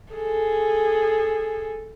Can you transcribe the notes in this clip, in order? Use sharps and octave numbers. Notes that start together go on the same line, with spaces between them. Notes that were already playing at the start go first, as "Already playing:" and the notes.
G#4 A4